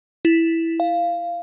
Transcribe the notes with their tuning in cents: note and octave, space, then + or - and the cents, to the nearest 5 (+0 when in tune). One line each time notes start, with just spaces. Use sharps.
E4 +0
F5 -10